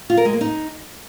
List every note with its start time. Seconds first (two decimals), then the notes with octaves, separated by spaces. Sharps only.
0.10 F4
0.17 A#4
0.25 G#3
0.33 A#3
0.41 D#4